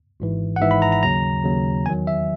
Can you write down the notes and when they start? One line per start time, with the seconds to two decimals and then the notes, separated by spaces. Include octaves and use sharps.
0.20 G#1 G#2 E3
0.56 F#5
0.61 G#1 G#2 E3 E5
0.71 B5
0.82 A#5
0.92 A#5
1.03 D#2 C#3 F#3 A#5
1.44 D#2 C#3 F#3
1.86 E2 D#3 F#3 G#5
2.07 E5